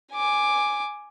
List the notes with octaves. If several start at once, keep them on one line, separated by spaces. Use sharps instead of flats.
G#5 D6